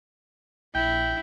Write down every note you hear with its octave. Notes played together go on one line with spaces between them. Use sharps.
A#1 E4 G5